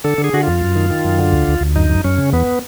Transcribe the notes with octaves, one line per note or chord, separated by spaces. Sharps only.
D3 A4
D3
G#4
D3 F#4
F2 F4
F#2
D#3
D#3
F#2
D3
D2
D2
D2
F#2 D#4
F#2
F#2 C#4
C#3
E2 B3